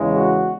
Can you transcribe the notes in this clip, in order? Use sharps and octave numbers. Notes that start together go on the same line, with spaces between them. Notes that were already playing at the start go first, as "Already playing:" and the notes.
Already playing: E2 C#3 G#3
F#4